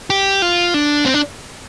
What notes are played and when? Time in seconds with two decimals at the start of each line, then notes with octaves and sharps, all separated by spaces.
0.10 G4
0.42 F4
0.74 D4
1.06 C4
1.14 D4